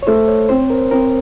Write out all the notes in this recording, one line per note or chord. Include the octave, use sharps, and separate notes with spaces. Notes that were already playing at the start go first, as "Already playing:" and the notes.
C#5
A3 C5
C#5
C4 C5
A#4
C4 A#4